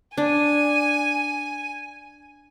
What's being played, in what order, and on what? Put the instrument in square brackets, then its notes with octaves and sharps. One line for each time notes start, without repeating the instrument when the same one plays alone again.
[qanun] D4 [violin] G#5